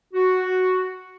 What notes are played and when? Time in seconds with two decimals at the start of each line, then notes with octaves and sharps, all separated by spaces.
0.13 F#4